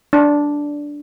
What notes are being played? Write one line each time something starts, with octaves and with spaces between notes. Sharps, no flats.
D4